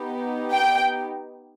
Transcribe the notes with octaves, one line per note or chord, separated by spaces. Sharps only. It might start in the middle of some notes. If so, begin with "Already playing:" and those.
Already playing: B3 D#4 G4
G5